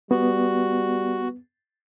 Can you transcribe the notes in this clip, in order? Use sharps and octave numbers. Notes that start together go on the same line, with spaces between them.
G3 B3 F#4